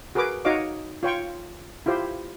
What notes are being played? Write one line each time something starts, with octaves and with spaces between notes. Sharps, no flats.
F#4 G#4 A#4 B4 D6
D#4 F#4 C#5 D#5 F5 D6
F4 C#5 G5 C#6
E4 F4 G4 C5